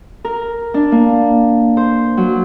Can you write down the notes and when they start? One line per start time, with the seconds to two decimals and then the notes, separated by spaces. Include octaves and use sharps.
0.25 A#4
0.74 D4
0.92 A#3
1.77 C5
2.17 F#3